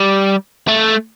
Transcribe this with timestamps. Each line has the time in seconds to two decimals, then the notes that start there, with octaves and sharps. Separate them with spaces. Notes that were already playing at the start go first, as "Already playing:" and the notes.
Already playing: G3
0.68 A3